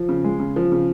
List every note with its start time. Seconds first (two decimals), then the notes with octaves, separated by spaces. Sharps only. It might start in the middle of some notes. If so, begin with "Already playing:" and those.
Already playing: F3
0.09 C#3
0.24 G#3
0.40 C#3
0.56 F3
0.72 C#3